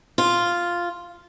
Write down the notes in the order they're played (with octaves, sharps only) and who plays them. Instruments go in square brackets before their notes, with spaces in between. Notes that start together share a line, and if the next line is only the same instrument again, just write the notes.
[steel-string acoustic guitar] F4